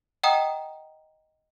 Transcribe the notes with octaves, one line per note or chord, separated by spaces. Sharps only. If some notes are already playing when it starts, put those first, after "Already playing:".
D#5 F#5 G5 A#5 D#6